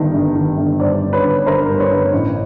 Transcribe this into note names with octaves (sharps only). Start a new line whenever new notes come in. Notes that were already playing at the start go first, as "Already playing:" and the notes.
Already playing: G1 G2 D#3
G1
D#3
G1
G2 C5 D5
G1
B4 C#5
G1
G1 A#4 C5
G2
B4 C#5
G1
A1